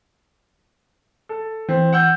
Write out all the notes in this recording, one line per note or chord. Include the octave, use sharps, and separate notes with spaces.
A4
E3 C4
F#5 E6 G6